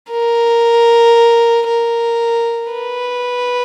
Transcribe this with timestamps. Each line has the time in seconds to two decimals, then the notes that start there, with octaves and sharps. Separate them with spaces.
0.11 A#4
1.68 A#4
2.72 B4